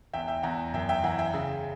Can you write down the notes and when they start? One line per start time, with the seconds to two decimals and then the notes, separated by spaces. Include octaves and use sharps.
0.13 E2 E5 G5
0.28 E5 G5
0.43 E2 F#5 A#5
0.74 F#2 E5 G5
0.89 E5 G5
1.04 E3 F#5 A#5
1.18 E5 G5
1.34 C#3